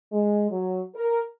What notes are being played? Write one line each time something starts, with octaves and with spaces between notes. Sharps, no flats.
G#3
F#3
A#4